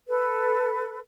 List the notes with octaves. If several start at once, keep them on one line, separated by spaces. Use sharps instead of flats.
A4 B4